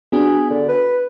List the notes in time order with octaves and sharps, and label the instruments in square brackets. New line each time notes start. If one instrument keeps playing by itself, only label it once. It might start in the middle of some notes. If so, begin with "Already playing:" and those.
[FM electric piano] B3 D4 F#4 [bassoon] G#4
[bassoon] D3
B4